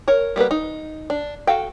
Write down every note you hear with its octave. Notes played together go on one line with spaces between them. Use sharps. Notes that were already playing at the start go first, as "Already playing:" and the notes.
A#4 C#5
G3 A#3 B3 B4
D#4
D4
F#4 A4 F5 G5